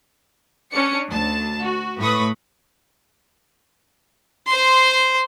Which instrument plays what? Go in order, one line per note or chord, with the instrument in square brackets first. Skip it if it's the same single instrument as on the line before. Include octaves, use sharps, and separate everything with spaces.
[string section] C#4 D4 C#7
D2 A5
F#4
A2 B4 B5 C#6 D#6
[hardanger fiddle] C5 C6